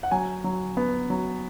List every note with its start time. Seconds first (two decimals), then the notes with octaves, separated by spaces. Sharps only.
0.03 F#5
0.11 F#3 G#5
0.44 F#3
0.77 B3
1.10 F#3